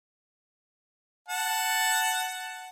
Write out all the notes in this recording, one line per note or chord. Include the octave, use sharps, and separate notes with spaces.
F#5 A5